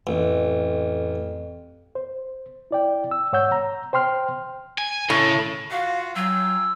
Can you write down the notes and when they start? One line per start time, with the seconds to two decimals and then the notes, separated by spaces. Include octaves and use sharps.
0.07 A1 F2
1.95 C5
2.71 E4 D5 G5
3.11 E6
3.33 G#2 C#5 F#5 E6 G6
3.52 A#5
3.93 C5 G5 C6 F6
4.78 G#5
5.10 A2 C#3
5.71 F4 F#4 F5
6.15 F#3 F4 G5 G#5 E6